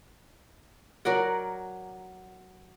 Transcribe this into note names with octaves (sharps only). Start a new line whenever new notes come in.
F#3 A#4 D5 F#5